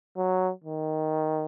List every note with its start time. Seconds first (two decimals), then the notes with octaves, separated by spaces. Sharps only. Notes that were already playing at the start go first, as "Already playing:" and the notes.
0.18 F#3
0.64 D#3